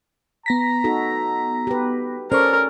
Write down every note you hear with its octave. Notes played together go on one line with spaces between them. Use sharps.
B3 A#5 A#6 B6
D#4 F#4 A4
G4 B4
C#4 A4 A#4 C5 D5 C#6